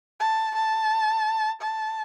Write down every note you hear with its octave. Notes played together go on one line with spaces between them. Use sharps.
A5
A5
A5